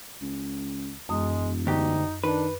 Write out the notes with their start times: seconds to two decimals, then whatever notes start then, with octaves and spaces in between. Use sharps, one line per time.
0.21 C#2
1.09 E1 F#2 G#3 D#6
1.67 D2 D#4 G4
2.24 D#3 D4 B4